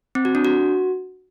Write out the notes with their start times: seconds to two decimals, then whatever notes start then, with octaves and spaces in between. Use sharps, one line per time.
0.15 C4
0.25 F#4
0.35 D4
0.45 F#4